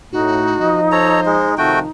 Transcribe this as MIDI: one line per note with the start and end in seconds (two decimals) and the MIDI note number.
0.12 0.56 45
0.12 1.90 63
0.12 0.80 66
0.59 1.45 53
0.59 1.45 75
0.92 1.20 69
0.92 1.52 72
0.92 1.20 73
0.92 1.20 82
1.26 1.55 56
1.58 1.84 48
1.58 1.84 51
1.58 1.84 53
1.58 1.79 57
1.58 1.79 66
1.58 1.79 79